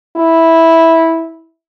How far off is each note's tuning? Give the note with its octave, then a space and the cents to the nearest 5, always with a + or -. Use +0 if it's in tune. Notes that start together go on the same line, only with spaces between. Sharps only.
E4 -10